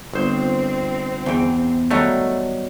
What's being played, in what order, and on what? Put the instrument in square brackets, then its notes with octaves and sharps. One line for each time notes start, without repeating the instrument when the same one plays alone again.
[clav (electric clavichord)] G1 C5 [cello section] C4
[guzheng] E2 G5
[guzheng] D#3 F#3 G3 [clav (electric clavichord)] A3